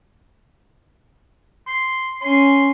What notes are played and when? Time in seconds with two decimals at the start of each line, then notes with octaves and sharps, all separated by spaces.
1.67 C6
2.22 C#4 C6